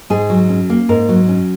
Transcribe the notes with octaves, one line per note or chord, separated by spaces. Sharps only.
G#2 G#4
F#3
C#4
A#3
G#2 A#4
F#3
C#4